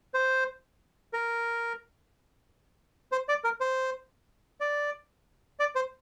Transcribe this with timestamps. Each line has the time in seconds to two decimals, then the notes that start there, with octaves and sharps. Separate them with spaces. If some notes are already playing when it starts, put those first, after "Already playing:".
0.14 C5
1.13 A#4
3.12 C5
3.29 D5
3.44 A#4
3.61 C5
4.61 D5
5.59 D5
5.75 C5